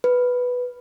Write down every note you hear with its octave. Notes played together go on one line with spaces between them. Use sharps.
B4